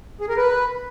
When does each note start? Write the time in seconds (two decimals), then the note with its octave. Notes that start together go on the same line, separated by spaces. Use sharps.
0.21 G#4
0.29 A#4
0.37 B4